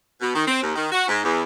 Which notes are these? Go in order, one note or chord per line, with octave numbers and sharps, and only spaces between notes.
B2
D#3
C4
D#2
D#3
F#4
G#2
E2